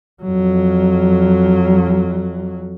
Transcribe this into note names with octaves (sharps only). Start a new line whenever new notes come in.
F2 F#3